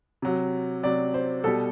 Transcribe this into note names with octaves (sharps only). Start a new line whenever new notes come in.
C3 F#3
C3 F#3 D5
C5
B2 G3 A4